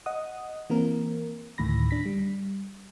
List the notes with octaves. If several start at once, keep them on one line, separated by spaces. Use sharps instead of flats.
D#5 F#5 D#6
E3 A#3 C4 A#4
D2 A2 D#3 B5 A#6
D4 B6
G3